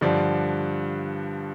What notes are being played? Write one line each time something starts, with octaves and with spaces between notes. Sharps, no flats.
G2 D3 F3 D5